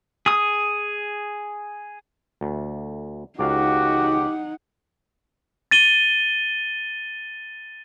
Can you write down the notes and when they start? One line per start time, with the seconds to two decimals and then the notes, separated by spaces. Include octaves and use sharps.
0.26 G#4 D#6
2.41 D2
3.39 C#2 D#4 F#4 G4 F5 F#5
5.71 A6 D#7 G7